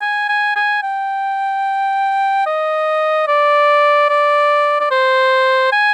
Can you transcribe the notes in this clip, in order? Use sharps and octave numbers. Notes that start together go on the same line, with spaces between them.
G#5
G#5
G#5
G5
D#5
D5
D5
D5
C5
G#5